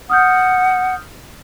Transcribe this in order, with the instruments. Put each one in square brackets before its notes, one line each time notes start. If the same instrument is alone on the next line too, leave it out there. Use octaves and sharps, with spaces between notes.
[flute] F#5 [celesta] D#6 F6 G6